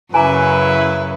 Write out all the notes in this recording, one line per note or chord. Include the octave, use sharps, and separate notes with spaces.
F#2 C#3 E4 B4 G#5 A#5 D6